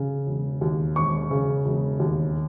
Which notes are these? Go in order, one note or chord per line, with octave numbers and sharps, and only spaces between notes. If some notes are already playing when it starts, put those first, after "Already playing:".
Already playing: C#3
E1
D#2
E1 C#6
C#3
E1
D#2